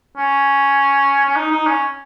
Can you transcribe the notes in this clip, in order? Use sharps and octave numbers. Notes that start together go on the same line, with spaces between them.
C#4
C#4
D#4
D#4
C#4